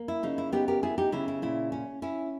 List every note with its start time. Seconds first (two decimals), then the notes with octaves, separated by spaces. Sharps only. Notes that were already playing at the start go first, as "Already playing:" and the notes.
Already playing: A#3
0.08 E4
0.23 C#3 D#4
0.38 E4
0.52 B3 D#4 G4
0.68 G4 A#4
0.83 B3 E4 G#4
0.98 D#4 G4
1.12 C#3 E4
1.28 E4
1.42 A#2 E4
1.72 C#4
2.02 C#4 E4